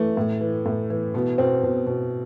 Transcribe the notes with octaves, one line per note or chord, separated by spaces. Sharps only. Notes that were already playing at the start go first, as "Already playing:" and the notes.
Already playing: E3 A3
A2
E3
A2
E3
B2 B3
B2 C4
B2
B2